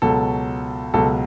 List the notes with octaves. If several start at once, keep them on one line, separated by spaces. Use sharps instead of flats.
C#2 B2 F#3 A4
C#2 B2 F#3 A4